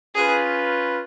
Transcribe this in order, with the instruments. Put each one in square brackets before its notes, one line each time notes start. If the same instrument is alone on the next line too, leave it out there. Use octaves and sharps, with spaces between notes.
[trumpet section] C#4 F4 B4 [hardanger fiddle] G#4